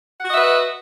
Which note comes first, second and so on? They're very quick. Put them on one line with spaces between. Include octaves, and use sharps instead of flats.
F#5 F#4 D#5 E5 B4